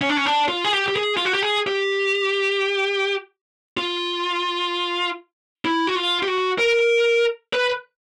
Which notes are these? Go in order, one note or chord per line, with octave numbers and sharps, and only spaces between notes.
C#4
D4
C#4
D4
F4
G#4
G4
G4
G#4
F4
F#4
G4
G#4
G4
F4
E4
F#4
F4
G4
F#4
A#4
B4